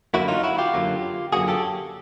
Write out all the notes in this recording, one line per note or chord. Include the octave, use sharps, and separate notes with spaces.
F#2 D3 F#3 A#3 E4 F#4
D#4 F4
E4 F#4
F4 G4
F#2 D3 F#3 A#3
F#2 D3 F#3 A#3 F#4 G#4
G4 A4